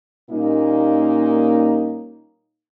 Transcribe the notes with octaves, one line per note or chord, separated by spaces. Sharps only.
A#2 G3 A#3 C#4 D#4